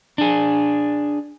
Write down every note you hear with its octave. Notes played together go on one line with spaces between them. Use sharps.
D4 G#4